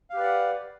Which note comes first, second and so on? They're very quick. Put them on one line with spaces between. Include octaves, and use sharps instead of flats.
F5 G4 B4 D5 F#5